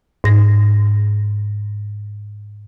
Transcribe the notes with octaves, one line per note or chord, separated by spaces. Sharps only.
G#2 A#6